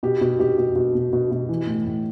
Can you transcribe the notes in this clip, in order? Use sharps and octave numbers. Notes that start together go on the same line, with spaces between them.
B2 G4
B2
B2 G4
B2
B2
B2
B2
B2
E3
A2
A2